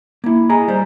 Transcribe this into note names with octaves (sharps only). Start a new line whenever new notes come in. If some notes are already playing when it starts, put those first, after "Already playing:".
A#3 E4
G#4 D#5 A#5
G3 C5